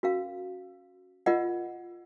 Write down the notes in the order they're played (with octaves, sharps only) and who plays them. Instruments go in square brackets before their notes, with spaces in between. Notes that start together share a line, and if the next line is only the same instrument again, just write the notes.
[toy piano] C#4 F#4 A#4 F5
F4 A#4 D#5 F#5